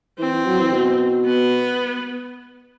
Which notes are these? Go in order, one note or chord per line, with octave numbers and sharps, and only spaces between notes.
E3 C4
E3
F#3
E3
B2
B3